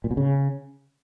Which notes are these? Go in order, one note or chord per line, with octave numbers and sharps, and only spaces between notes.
A#2
B2
C#3